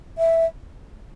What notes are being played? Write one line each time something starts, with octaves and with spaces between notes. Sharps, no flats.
E5